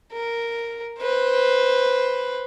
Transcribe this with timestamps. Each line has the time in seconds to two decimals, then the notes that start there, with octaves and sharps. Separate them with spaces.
0.13 A#4
0.99 B4 C5